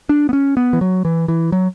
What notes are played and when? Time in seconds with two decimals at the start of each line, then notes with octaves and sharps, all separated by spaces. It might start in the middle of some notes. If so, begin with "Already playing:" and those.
0.09 D4
0.29 B3
0.33 C#4
0.57 B3
0.73 E3
0.81 F#3
1.05 E3
1.28 E3
1.52 F#3